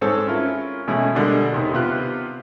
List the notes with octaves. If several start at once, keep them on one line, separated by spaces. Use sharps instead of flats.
G#2 C4 G#4 A4 C#5 A5
C#4 E4 F4 A#4
B2 E3 G#3 A3 C#4 E4
B2 D3 G3 G#3 A#3 D4
D#2 C3 D#3
C3 B3 F4 G4 F#6